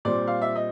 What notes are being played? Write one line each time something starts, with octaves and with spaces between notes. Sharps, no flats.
A#2 G3 C4 D5
F5
E5
D#5